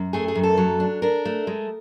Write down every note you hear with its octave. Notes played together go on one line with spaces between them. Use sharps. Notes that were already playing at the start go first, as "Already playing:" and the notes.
Already playing: F#2
A3 G#4
G#4
F#2
A4
F#3
D4
D4 A#4
A3
G#3